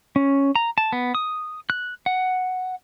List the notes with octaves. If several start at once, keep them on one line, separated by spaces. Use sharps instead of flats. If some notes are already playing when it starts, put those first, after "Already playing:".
C#4
A#5
A5
B3
D#6
F#6
F#5